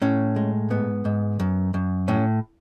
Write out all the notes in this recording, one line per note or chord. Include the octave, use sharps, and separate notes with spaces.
A2 C#4
G#3
G#2 B3
G#2
F#2
F#2
A2 C#4